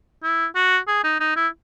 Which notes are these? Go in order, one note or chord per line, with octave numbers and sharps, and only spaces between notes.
E4
F#4
G#4
D#4
D#4
E4